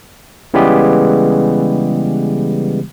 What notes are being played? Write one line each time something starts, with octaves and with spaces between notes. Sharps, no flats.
C#3 E3 G3 G#3 B3 G4